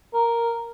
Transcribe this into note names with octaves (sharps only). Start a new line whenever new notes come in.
A#4